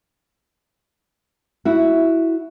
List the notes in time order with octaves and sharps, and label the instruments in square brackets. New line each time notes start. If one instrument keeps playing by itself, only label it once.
[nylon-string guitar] E4 F#4